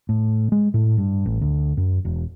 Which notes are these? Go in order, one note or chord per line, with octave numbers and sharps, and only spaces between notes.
A2
G#3
A2
G2
A1
D2
F#2
E1